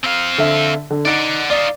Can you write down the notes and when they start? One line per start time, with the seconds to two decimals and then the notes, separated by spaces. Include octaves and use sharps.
0.04 C4 F5
0.38 D3 E5
0.91 D3
1.05 D#4 D5 F#5 D7
1.50 D#4 F4 D5